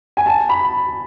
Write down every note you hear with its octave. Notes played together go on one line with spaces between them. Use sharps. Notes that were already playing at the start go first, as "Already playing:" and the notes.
G#5
A5
B5